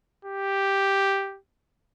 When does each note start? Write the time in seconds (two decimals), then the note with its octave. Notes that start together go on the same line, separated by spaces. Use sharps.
0.25 G4